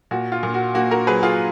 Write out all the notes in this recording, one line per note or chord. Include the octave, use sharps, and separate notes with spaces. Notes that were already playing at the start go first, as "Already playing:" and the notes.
A#2 F#4
F4
A#2
F#4
A#3 F#4
F#4 A#4
F#3 G#4 B4
F4 G#4